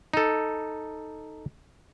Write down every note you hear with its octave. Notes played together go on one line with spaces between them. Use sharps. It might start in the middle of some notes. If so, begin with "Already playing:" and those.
D#4 A4